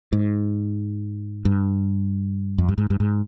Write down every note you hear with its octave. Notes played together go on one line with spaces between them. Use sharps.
G#2
G2
F2
G2
G#2
G2
G#2